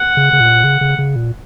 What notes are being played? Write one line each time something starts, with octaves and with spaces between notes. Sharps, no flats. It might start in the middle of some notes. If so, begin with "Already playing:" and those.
Already playing: F#5
C#3
C#3
A#2
C#3
C#3
C#3
A#2